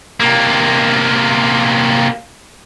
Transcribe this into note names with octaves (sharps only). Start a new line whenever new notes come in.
C3 A#3